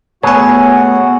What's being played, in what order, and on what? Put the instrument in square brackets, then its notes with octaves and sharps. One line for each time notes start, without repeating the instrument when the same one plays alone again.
[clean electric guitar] A3 G#4 B4 [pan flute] B3 [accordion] F#4 F#5 [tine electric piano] C#5 G#5